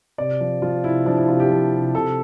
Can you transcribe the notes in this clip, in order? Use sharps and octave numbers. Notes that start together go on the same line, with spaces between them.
C3 D5
F3
F3 F4
C3 E4
F3 D4
E4
C3 F4
G4
F3
C3
C3 A4